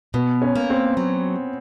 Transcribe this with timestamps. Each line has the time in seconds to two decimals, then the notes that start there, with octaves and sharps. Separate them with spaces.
0.14 B2 B3
0.42 C#4
0.56 A#3
0.70 C4
0.97 F#3